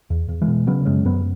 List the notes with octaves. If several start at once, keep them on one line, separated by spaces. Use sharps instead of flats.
E2
E2
E3 G#3
B2
C#3 F#3 B3
F#2 G#3 C#4
F#2 F#3 B3